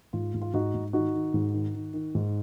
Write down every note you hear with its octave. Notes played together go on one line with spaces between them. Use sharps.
G#2 F4
G#2
F4
G#2 D#4 F#4
G#2
D#3 D#4 F#4
D#3
G#2
D#3
D#3
D#3
G#2